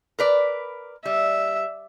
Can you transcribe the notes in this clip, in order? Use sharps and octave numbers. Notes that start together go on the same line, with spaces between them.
A#4 B4 D5
G3 E5